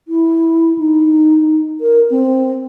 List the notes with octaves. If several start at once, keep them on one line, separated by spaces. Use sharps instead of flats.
E4
D#4
A#4
C4